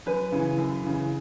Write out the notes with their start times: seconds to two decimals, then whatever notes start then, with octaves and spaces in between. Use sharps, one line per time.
0.06 F#2 B4
0.32 C#3 E3
0.58 F#2
0.83 C#3 E3